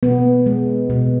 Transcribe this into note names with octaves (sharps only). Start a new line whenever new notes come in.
B2 B3
G#3
B2